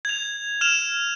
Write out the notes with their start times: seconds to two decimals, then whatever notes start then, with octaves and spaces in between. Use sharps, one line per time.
0.05 G#6 F7
0.61 F6 E7 F7